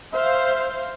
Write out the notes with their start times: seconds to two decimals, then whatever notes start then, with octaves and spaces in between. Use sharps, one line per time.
0.13 C5 E5 F5